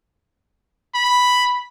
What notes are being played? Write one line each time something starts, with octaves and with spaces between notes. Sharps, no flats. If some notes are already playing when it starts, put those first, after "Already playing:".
B5